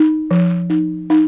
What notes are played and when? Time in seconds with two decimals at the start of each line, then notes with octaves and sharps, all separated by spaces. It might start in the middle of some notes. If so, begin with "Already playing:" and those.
Already playing: D#4
0.31 F3
0.70 D#4
1.10 D#4